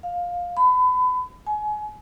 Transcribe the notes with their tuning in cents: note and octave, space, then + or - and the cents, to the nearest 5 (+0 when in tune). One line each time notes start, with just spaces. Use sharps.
F5 +15
B5 +30
G#5 +30